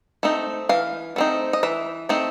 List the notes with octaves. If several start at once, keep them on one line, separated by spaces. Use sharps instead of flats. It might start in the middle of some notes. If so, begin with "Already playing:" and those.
A3 C4 D#4
E3 F5
A3 C4 D#4
D#5
E3 E5
A3 C4 D#4